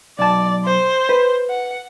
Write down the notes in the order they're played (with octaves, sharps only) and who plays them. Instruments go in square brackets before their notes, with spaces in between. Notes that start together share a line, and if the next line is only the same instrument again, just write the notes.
[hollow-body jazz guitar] B1 A5 [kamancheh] D5
[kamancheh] C5
[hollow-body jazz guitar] B4
[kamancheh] F#5